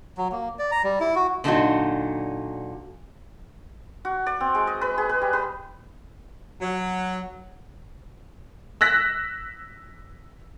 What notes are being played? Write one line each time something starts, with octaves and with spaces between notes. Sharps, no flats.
F#3
A#3
D5
A#5
G3
E4
F#4
A#2 D3 F#3 C#4 D#4 F#4
F#4
D5
C4
G#3
D#5
B4
G#4
B4
G3
B4
F#3
E6 F#6 A#6 B6